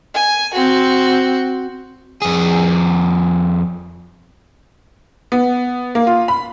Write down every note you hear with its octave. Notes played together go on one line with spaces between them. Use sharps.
G#5
C4 F#4
F2 G#4
B3
A#3
F4
B5